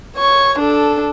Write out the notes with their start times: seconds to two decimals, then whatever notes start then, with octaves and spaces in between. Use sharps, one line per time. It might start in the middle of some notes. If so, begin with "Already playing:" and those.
0.16 C#5 C#6
0.59 D4 A4